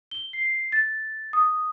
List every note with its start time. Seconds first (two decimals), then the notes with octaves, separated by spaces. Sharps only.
0.11 G7
0.33 C7
0.72 A6
1.33 D#6